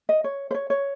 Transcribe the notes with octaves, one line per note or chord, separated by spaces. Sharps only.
D#5
C#5
C5
C#5
C#5